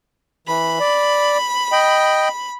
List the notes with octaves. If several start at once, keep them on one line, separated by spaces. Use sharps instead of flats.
E3 B5
D5
D#5 G5